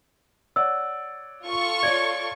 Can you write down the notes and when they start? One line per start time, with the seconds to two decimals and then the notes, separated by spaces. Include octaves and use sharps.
0.56 C#5 D5 F#5 E6
1.44 F4 A4 C#6
1.83 C#5 D5 G#6